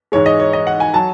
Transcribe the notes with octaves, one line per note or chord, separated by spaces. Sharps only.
G#2 E3 G#3 C#5
D#5
C#5
D#5
F#5
G#5
F#3 A5